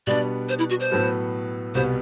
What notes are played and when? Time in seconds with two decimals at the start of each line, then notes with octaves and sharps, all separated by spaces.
0.07 B2 G3 B3 D4 D5
0.49 C5
0.59 E4
0.70 F#4
0.80 C5
0.91 A2 F#3 B3 F#4 A4
1.75 C2 B2 G3 B3 C5